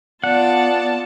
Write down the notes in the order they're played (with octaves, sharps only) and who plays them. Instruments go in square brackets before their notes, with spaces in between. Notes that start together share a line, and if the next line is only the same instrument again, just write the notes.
[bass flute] B3 [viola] F4 A5 [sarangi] D5 [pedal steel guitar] F#5